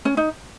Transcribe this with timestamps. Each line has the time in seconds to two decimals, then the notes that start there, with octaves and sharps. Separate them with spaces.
0.05 C#4
0.17 D#4